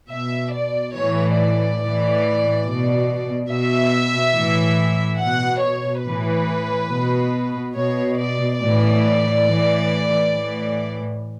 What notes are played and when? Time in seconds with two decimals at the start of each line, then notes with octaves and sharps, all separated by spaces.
0.10 B2 E5
0.53 D5
0.95 A2 E3 C#5
1.38 D5
1.80 A2 E3
2.66 B2
3.50 B2 E5
4.36 A2 E3
5.21 B2 F#5
5.63 C#5
6.06 A2 E3 B4
6.91 B2
7.76 B2 C#5
8.19 D5
8.61 A2 E3 D5
9.47 A2 E3
10.32 A2 E3